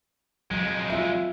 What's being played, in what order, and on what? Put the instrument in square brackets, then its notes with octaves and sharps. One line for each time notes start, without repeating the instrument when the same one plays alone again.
[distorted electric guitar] F2 G#3 [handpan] F#3
[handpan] F4 E5